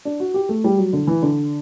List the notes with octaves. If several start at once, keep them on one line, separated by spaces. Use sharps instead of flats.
D4
F#4
G4
A3
G3
F#3
D3
E3
D3